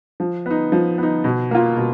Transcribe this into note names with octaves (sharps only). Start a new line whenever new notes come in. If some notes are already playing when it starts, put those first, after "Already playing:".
F3
B3 D#4
F3
B3 D#4
B2
A#3 F4
B2